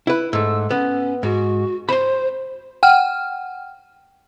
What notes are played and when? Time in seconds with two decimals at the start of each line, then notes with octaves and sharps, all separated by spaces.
0.07 E4 B4
0.33 G#2 A3 E6
0.71 B3 C#4
1.23 G#2 F#4
1.89 C5 B5 C6
2.83 F#5 G5 F6